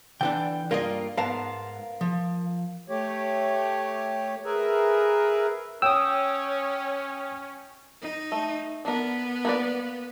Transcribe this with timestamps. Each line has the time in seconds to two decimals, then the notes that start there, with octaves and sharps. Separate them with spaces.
0.21 D3 E3 D4 G5
0.71 G2 A#3 F4 A#4 D5 D#5
1.17 G#2 B3 A#4 F5 A5 A#5
2.01 F3
2.89 A3 G4 C#5
4.45 G#4 A#4 B4 E5
5.82 C#4 C#5 G5 D#6 E6
8.01 D#4
8.32 A3
8.85 B3 D4 A#4
9.45 A#3 B4 D5